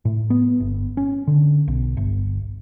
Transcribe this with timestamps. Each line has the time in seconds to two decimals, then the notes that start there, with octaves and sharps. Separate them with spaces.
0.05 A2
0.30 B3
0.60 G1
0.97 C#4
1.28 D3
1.68 B1
1.97 G1